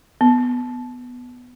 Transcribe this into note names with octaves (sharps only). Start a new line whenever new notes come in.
B3